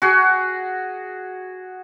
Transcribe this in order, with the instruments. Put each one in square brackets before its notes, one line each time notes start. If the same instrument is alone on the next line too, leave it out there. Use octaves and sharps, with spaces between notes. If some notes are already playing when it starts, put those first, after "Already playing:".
[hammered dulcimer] F#4 G#4